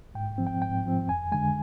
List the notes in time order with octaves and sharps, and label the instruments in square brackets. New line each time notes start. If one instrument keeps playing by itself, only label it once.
[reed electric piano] G#2 G5
F3 C4
G5
G#2 G5
F3 C4
F2 G#5
D3 G#3 G#5